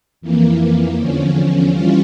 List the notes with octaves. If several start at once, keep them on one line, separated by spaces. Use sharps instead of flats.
F2 E3 A#3
E2 D3 F3 C#4
E3 G3 C#4 F4